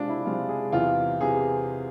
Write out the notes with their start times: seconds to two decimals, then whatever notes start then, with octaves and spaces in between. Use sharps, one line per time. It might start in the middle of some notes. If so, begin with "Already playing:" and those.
Already playing: C3 G#3 C4 D4 F4
0.09 E4
0.25 C3 G#3 C4 F4
0.49 G#4
0.72 E2 C3 E3 F4
1.20 C3 E3 G#4